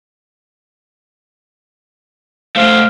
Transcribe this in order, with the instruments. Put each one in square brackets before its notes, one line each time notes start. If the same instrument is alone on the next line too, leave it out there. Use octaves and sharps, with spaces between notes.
[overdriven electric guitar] A3 C5 [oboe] F5